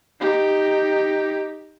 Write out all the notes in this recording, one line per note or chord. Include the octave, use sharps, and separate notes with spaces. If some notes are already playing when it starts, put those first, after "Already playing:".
D#4 G4